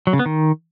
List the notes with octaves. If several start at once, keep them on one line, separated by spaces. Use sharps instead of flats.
F#3
C#3
B3
D#3